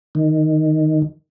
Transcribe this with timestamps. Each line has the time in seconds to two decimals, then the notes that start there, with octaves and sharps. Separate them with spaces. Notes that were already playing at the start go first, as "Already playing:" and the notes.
0.15 D#3